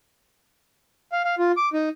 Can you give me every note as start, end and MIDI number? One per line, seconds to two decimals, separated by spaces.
1.12 1.22 77
1.25 1.35 77
1.38 1.52 65
1.57 1.69 86
1.73 1.89 63